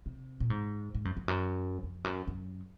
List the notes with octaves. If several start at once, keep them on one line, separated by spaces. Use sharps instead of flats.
C3
A#2
G#2
G#2
F#2
F2
F#2
F2
F#2
F#2